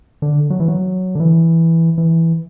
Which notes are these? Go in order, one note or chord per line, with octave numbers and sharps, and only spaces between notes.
D3
F#3
E3
F#3
D3
E3
E3